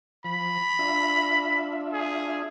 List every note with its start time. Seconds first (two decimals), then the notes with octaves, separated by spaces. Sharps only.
0.24 F3 B5
0.79 D4 F4 E5
1.93 G#4